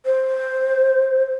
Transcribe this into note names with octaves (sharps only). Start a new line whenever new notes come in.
C5